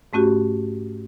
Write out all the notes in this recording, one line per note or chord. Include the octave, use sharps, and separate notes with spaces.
G#2 A3 C#4 F#4 G4